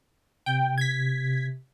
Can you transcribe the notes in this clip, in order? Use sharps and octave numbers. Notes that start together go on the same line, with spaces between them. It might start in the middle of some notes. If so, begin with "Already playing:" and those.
C3 G5
G#6 B6